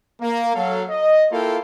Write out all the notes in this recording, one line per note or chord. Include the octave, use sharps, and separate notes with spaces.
A#3
F#3 A4 F5
D#5
A#3 E4 F4 A4 F5 G5